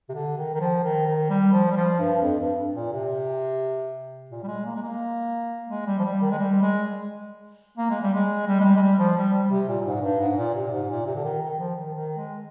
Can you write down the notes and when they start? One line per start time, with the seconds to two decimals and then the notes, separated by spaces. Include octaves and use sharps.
0.09 C3
0.14 D3
0.38 D#3
0.55 D#3
0.61 F3
0.84 D#3
1.06 D#3
1.30 G3
1.53 F3
1.71 G3
1.77 F3
1.99 G2
2.22 F2
2.39 G2
2.75 A#2
2.92 C3
4.31 A#2
4.44 G3
4.48 G#3
4.65 A#3
4.76 G#3
4.82 A#3
5.69 G#3
5.86 G3
6.00 F3
6.05 G3
6.22 D#3
6.31 G#3
6.39 G3
6.62 G#3
7.78 A#3
7.91 G#3
8.02 G3
8.15 G#3
8.47 G3
8.60 G#3
8.65 G3
8.77 G#3
8.82 G3
8.99 F3
9.17 G3
9.33 G3
9.51 C3
9.68 A#2
9.81 A#2
9.85 G#2
10.02 G2
10.20 G#2
10.37 A#2
10.55 C3
10.72 G#2
10.90 A#2
11.07 C3
11.16 D3
11.24 D#3
11.41 D#3
11.59 F3
11.76 D#3
11.94 D#3
12.17 G#3